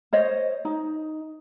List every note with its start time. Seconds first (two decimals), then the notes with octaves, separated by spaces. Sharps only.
0.13 C5 C#5 D#5
0.65 D#4